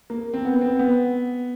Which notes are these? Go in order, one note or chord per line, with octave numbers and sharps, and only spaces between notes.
A#3
C4
B3
C4
B3